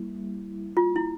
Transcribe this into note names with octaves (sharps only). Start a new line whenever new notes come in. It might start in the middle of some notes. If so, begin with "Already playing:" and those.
Already playing: G3 A#3 E4
F4
E4